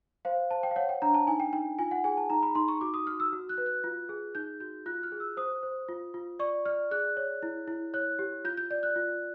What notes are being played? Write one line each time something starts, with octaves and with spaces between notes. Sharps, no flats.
C5 F5
C5 A5
G5
F5
C#5 F#5
G5
D4 A#5
A5
D#4 G#5
G5
D#4 G5
F4 G#5
F#5
G#4 G#5
A5
D#4 A#5
B5
D#4 C6
C#6
F#4 D6
D#6
F#4 F6
E6
F#4
F#6
B4
F#6
F4
G#4
D#4 G6
F#4 G6
F4 F#6
F6
G#4
E6
C5 D#6
C5
F4
F4
D5 C#6
D5 F6
G#4 F#6
C#5
E4
E4
C#5 F#6
G4
F4 G6
G6
D5 G6
F#6
F4